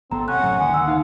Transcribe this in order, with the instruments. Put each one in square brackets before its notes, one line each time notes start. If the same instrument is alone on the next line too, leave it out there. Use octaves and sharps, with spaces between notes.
[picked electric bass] G#1 B3 [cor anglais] C4 [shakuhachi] A4 [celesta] A#5
[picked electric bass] C3 [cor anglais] C#4 [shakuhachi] F#5 [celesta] F#6
[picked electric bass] F#1 A2 F#3
[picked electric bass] D2 D#3 A#3 [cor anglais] G#3 [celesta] G#5
[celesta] E6
[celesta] D#4 [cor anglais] F5